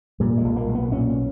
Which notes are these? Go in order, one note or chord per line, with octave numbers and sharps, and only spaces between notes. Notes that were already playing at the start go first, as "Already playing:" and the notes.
A#2 G3
G#3
B1
A#3
B1
B3
A#2 C#4